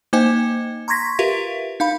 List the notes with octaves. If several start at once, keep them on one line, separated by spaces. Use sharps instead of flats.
A#3 D#4 C5 D#5 G5 G#5
A#5 C6 C#6 G#6 A#6 B6
F4 G4 A#4 B4 E5 F5
D#4 F5 B5